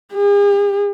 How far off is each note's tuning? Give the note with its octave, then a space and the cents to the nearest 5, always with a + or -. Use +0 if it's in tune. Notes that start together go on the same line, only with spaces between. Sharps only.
G#4 -45